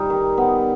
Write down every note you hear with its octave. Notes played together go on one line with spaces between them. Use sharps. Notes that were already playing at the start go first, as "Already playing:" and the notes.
Already playing: G3 D#4
D#3
B3